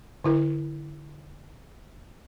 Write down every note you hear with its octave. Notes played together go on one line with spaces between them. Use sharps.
D3 E4 A#4